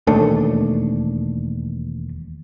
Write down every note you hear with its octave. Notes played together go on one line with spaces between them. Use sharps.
E1 D#2 A3 D4